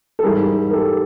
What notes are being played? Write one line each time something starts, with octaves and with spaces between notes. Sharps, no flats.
A4
G#2 E3 G3 G#4 A#4
A#4
G4 A4